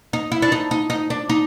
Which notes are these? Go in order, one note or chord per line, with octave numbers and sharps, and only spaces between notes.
D#4
E4
D4
D#4
D#4
D#4
D4
D#4